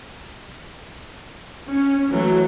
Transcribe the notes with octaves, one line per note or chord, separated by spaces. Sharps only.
C#4
E3 F#3 A3